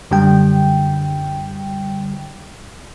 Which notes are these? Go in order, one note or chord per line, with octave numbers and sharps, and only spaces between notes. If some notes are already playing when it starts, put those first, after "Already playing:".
F#2 D3 G3 G5